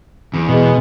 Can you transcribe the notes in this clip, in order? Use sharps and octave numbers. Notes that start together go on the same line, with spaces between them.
E2
B2 G#3